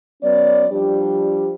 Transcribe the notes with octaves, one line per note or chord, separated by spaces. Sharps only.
F#3 B3 C#4 C#5 D5
F3 G3 D4 G4